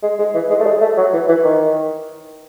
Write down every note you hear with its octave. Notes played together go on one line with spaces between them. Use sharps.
G#3
G#3
E3
G#3
A3
G#3
A3
F#3
E3
E3
D#3